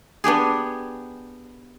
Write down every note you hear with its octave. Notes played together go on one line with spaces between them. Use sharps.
B3 D4 G4 G#4